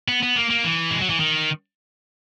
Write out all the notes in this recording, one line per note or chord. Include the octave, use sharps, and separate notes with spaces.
B3
B3
A#3
A#3
E3
G#3
F#3
E3
D#3